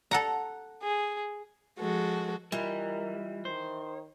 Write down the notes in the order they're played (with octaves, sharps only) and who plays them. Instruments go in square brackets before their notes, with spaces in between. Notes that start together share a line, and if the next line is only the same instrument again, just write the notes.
[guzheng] A4 F#5 A#5
[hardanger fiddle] G#4
[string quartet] F3 G#3 F#4 A4
[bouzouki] E3 [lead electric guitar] G3 [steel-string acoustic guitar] F4 D#5 [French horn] A#4
[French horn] D#3 [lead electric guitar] C5